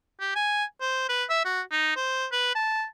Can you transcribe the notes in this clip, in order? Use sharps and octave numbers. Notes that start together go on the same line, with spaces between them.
G4
G#5
C5
B4
E5
F#4
D#4
C5
B4
A5